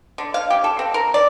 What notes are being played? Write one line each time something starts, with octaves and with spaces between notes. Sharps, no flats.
D3
F5
G4
A4
C4
A#4
D5